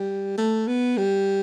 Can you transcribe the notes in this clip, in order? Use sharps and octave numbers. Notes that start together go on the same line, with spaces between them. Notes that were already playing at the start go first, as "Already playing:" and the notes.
Already playing: G3
A3
B3
G3